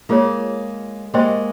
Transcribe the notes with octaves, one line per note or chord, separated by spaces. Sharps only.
G#3 A#3 F4 G#4 C#5
G#3 A#3 G4 C5 D#5 G5 C6